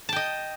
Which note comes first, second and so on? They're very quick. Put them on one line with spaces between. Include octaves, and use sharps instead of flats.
A5 G5 D#5